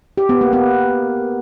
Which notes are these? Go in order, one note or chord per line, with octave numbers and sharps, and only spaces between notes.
G4
B3
A#3
B3